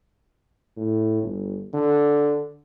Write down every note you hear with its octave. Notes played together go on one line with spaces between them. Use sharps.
A2
G1
D3